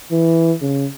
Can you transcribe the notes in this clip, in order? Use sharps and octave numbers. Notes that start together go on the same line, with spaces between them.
E3
C#3